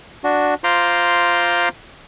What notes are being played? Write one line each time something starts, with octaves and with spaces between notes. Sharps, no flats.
D4 F#4
F4 C5 A#5 C6 D6